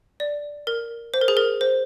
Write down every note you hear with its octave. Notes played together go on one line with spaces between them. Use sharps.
D5
A#4
C5
A#4
G#4
A#4
C5